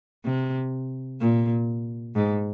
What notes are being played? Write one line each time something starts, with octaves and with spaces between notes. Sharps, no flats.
C3
A#2
G#2